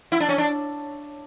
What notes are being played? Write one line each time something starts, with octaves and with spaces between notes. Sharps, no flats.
E4
D4
C#4
D4